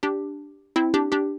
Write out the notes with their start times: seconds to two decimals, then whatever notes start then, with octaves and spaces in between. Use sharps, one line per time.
0.03 D4 G4
0.76 C4 E4
0.94 D4 G4
1.12 D4 G4